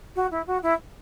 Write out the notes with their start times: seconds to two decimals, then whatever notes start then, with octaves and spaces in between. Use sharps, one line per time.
0.16 F#4
0.31 E4
0.47 F#4
0.63 E4